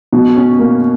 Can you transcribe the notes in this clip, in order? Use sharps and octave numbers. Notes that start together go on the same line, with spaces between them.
B2
C#4
A#3